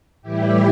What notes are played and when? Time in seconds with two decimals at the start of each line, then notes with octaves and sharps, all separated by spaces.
0.22 A2 E3 G3 E4 G4